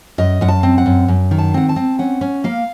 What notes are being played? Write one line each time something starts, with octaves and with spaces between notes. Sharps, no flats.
F#2 D#5
F#2 F#5
A5
C4
F#5
F#2
F#2
D#3
A5
C4 F#5
A5
C4
C#4 F#5
C#4
A#3 F5